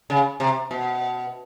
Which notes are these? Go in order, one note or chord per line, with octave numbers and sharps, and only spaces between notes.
C#3
C3
B2